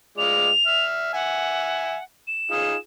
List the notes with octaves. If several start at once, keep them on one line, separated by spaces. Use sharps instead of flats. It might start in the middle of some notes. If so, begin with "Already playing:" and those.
G#3 F4 D5 F7
E5 F6
E5 F#5 G#5
E7
D#4 F4 G#4